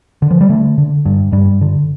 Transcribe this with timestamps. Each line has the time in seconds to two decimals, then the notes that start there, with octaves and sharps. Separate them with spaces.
0.22 D3
0.31 F3
0.41 G3
0.49 D3 A3
0.78 D3
1.05 G2
1.32 G2 G3
1.61 D3